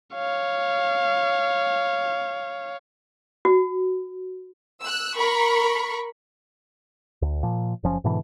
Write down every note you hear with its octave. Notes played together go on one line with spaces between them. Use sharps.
C#5 F5
F#4
E6 F#6
A#4 B5 C#6
D2
A#2 F3
F#1 F3 C#4
G#2 B2 D3 E3